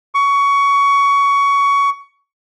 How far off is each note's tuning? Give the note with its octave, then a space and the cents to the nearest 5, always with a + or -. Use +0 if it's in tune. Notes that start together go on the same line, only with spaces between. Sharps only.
C#6 +20